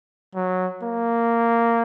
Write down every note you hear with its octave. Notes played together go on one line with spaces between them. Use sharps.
F#3
A#3